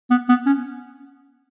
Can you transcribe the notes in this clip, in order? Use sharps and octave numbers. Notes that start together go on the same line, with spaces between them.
B3
B3
C#4